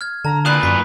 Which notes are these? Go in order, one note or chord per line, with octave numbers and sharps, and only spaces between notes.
F6 G#6
D3 A5 A#5
A#2 B4 D5 D#6 F#6 C7
F#2 C#6 B6